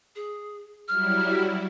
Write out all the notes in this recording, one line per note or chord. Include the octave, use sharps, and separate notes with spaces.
G#4
F#3 G3 E4 F6